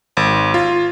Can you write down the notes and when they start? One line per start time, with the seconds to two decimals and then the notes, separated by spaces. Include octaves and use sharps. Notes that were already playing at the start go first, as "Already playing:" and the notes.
0.17 G#1
0.54 F4